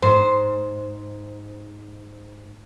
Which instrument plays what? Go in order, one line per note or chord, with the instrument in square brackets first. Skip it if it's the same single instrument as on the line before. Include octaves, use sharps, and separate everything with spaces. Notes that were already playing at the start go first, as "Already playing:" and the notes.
[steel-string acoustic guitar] G#2 [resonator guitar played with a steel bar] C5